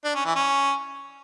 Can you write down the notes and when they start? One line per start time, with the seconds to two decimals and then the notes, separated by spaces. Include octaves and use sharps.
0.05 D4
0.15 C#4
0.25 E3
0.36 C#4